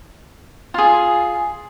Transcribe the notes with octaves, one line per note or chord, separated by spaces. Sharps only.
F4 G#4